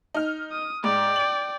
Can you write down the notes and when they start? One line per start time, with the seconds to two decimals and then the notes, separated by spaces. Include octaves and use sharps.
0.14 D#4 F6
0.52 D#6
0.84 G#2 D5 G5
1.16 D7 F#7